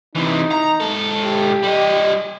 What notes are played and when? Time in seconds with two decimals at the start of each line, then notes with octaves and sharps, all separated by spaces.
0.15 C3 E3 D#4
0.52 A#5
0.80 G#2 A4
1.25 G4
1.63 G3 D#5